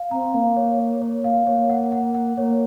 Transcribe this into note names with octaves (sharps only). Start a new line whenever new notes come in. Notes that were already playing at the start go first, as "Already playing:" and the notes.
Already playing: F5
C4 A#5
A#3 F5
C#5
C#5
C#5
F5
A#3 C#5
F#5
F#5
F#5
A#3 C#5